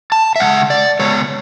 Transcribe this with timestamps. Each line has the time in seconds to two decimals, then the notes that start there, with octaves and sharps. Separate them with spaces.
0.12 A5
0.36 E5
0.40 C#3 G#3 F#5
0.70 D5
0.99 C#3 G#3 B3 C#5